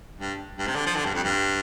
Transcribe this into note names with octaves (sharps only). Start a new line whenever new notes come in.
G2
G2
C3
D3
F3
D3
G2
F2
G2